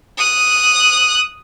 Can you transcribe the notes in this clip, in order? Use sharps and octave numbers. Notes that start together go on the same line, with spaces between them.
D#6 F#6